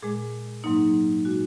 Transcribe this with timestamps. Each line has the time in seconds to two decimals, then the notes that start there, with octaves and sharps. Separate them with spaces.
0.02 A#2 G#3 G#4
0.64 G#2 F#3 A#3 D#4
1.25 A#2 G#3 F#4